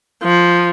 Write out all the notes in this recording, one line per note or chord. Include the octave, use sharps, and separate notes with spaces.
F3